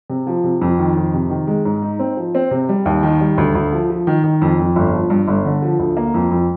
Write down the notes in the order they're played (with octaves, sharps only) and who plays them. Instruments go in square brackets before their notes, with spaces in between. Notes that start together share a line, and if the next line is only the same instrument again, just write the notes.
[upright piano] C3
F3
C3
F2
D#3
F2
C3
D#3
G#3
G#2
D#4
C4
F3
C4
C3
G3
D#2
D#3
G3
D2
D2
F3
F3
D#3
D#3
F2
F2
G1
F3
G2
G1
D3
F3
D2
A#3
F2
F2